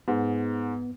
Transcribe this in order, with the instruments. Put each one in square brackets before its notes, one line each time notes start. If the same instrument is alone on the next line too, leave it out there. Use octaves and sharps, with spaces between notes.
[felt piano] G#2 [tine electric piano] B3